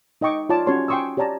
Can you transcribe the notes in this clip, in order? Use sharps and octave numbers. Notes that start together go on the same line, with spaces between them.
D#4 D#5 G5 C#6 D6
F4 C#5 D5 A5 D6
C#4 F#4 G4 C#5 A5 C6
G5 G#5 C6 C#6 D#6 E6
G4 C#5 D5 A5 A#5